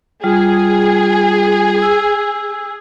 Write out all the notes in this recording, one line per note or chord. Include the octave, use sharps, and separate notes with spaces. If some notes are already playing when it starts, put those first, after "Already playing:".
G3 F4 G#4
E6